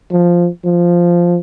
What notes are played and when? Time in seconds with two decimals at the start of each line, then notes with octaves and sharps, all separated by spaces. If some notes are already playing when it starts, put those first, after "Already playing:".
0.11 F3
0.65 F3